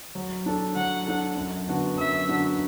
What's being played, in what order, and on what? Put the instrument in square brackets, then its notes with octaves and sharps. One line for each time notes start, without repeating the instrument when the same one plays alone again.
[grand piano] F#3
D4 A4
[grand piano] F#3 [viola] F#5
[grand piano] D4 A4
F#2
D3 B3 D4 F#4
[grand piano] F#2 [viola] E5
[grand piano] D3 B3 D4 F#4